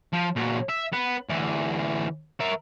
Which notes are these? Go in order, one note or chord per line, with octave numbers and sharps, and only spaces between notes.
F3
A#2 F#3
E5
B3
D2 E3
A#4 E5